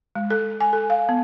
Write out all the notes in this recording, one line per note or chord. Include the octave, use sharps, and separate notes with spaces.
G#3
A4
G#5
A4
F5
B3